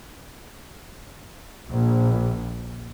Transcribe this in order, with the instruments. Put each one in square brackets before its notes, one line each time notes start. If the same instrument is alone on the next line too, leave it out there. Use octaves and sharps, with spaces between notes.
[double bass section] A#1